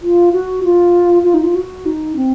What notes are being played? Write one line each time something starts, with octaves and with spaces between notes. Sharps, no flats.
F4
F#4
F4
F4
D#4
F4
F#4
D#4
C4